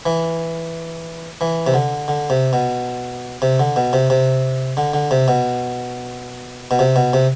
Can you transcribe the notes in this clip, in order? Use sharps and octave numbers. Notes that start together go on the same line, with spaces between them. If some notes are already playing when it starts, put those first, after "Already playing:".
E3
E3
C3
D3
D3
C3
B2
C3
D3
B2
C3
C3
D3
D3
C3
B2
B2
C3
B2
C3